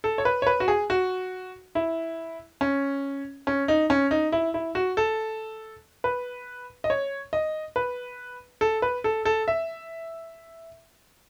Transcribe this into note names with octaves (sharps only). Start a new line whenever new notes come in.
A4
C#5
B4
C#5
B4
F#4
G#4
F#4
E4
C#4
C#4
D#4
C#4
D#4
E4
E4
F#4
A4
B4
D#5
C#5
D#5
B4
A4
B4
A4
A4
E5